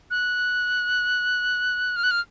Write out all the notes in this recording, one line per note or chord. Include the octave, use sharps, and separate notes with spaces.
F#6
F6
F#6
F6